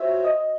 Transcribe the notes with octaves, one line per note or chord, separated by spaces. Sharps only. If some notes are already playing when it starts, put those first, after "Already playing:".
Already playing: F4 F#4 C5 C#5 E5
D#5